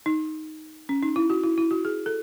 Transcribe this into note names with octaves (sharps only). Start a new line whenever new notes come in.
D#4
C#4
D#4
E4
F#4
E4
E4
F#4
G#4
A4